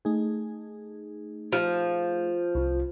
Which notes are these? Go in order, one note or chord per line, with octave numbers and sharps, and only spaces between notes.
A3 D#4 G#4
F3
C2 F4